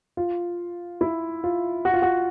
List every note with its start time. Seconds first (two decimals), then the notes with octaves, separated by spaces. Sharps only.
0.17 F4
1.01 E4
1.44 F4
1.85 F#4
1.94 F4
2.02 F#4